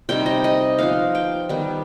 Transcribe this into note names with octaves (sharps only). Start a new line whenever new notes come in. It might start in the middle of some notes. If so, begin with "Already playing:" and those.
C3 G3 C4 D#4 G5
D#5
D#5
F3 B3 D#4 F5
G5
D#3 G3 B3